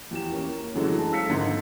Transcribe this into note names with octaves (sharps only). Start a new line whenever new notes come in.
E2 G4 E7
A#3 C#4
F#2 D3 E3 F#3 G#3 A3
A5
F5 E6 B6 C#7
G#1 D3 C6